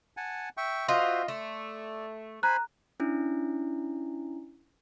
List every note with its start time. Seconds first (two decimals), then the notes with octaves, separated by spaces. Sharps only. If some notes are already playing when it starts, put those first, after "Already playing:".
0.17 F#5 G#5 A5
0.57 E5 G5 C#6
0.88 F4 F#4 C5 D#5 E5 C6
1.28 A3 D5
2.43 C5 G#5 A#5 B5 F#6
3.00 C#4 D4 E4